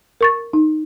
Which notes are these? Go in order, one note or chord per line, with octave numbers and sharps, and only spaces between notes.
A#4 C#6 A6
D#4